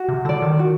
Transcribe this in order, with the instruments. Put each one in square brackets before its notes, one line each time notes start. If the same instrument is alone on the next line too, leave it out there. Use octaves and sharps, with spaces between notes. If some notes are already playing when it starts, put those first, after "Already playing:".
Already playing: [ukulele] F#4
[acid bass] C3
[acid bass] D3 [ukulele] A4 D5
[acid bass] D#3
[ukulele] F#4